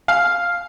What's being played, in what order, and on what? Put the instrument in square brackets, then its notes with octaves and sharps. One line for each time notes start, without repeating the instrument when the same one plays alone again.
[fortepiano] F5